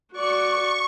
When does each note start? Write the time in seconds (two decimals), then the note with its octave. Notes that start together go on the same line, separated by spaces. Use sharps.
0.13 F#4 D5 C#6